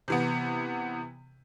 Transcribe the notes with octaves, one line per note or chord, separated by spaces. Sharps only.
C3 E3 B3